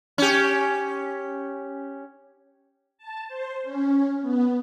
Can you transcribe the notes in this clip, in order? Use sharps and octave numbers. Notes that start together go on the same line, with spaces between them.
C#4 G4
A5
C5
C#4
B3